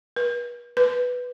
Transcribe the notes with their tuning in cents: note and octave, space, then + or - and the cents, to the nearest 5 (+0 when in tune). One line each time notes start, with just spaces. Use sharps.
B4 -40
B4 +0